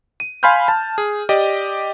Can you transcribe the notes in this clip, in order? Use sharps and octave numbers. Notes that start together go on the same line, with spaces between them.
D#7
F5 G#5 B5 C6 F6 G6
A5
G#4
G4 D5 D#5